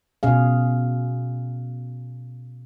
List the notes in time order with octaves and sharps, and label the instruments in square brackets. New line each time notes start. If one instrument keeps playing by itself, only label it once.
[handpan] B2 C#4 G#4 F5